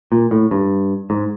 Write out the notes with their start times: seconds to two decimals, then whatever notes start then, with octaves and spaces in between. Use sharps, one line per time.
0.12 A#2
0.31 A2
0.51 G2
1.10 G#2